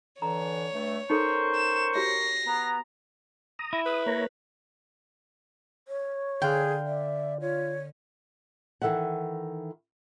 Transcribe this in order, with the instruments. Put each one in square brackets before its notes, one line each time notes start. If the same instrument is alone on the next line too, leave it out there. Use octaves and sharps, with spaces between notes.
[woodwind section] D3 E3 [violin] C#5 [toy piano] A#5
[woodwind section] G2 A3
[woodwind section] C#4 A#4 C#6 [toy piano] D#4 A4 [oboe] C5
[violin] E7
[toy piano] F#4 G4 C#5 [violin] A#6 C7
[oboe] B3 [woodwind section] A#5
[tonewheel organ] A#5 D#6
[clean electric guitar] E4
[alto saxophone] B4 [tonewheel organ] D#6
[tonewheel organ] A#3 C#5 A#5
[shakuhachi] C#5
[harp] D3 F5 F#6 [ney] G#4 [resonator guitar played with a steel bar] G5
[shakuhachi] D5 [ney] E5
[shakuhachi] F4 [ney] C#5
[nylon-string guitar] D#3 E3 A4 E5 F#5